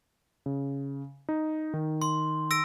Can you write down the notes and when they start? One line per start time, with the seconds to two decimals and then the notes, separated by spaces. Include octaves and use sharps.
0.46 C#3
1.29 D#4
1.74 D#3
2.02 C6
2.51 E6 A#6 D7